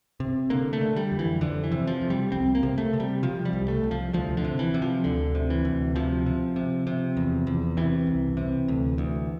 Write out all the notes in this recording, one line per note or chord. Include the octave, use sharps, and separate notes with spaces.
C3
D3 A#3
A3
D3
G3
F2
E3
F2 D3
E3
C3
F3
F2
G3
C2 C4
A#3
C3
A3
C3
G3
C3 F3
G3
C2
A3
C2
F3
D2 F3
D3
C3
E3
C3
F3
D2 D3
C3
E3
D2
C3 F3
C3
C3
C3
E2
E2
C3 E3
C2
C3
D2
D2